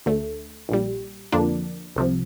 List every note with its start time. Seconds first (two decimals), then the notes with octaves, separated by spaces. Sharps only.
0.06 D2 D3 A3
0.69 A#1 A#2 G3
1.32 F2 D3 F3 A#3 D4
1.96 C2 C3 F3